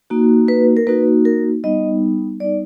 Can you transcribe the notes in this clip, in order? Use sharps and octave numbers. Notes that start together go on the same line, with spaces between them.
A#3 D#4 F#4
B4
A#4
A#3 D#4 F#4 B4
A#4
G3 B3 D#4 D#5
G3 B3 D#4 D5